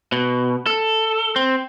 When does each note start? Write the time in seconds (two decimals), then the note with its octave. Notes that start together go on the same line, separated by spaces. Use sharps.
0.12 B2
0.66 A4
1.36 C4